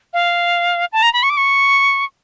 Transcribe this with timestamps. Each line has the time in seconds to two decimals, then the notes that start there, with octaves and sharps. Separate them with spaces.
0.13 F5
0.92 A5
1.02 A#5
1.13 B5
1.23 C#6
1.30 D6
1.37 C#6